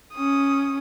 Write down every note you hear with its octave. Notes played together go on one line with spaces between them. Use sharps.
C#4 D#6